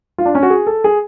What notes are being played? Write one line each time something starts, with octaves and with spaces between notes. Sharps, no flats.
F4
D4
C#4
F#4
G#4
A4
G#4